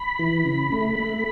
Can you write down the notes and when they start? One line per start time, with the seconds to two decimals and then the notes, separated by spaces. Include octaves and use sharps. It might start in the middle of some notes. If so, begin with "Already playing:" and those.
Already playing: B5
0.19 E3
0.45 C#3
0.72 A3
0.99 A3